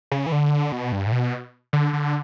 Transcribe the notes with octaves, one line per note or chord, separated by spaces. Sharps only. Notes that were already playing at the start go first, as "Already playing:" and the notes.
C#3
E3
D3
B2
G2
A2
B2
D3
D3